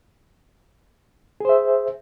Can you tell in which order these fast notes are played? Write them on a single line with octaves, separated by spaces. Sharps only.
G#4 C5 E5